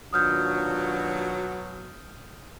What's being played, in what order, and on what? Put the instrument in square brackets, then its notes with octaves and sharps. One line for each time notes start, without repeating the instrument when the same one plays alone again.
[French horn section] D#2 D4 F4 [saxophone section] B2 F#3 [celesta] D#6 F6 G6